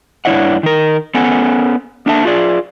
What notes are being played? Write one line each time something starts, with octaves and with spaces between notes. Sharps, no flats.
G2 D4 E4 C#5 D#5 F#5
D#3 A#4
B3 C#4 A4 F#5 G#5
A#3 D4 A4 E5 A5
F4 G#4 D5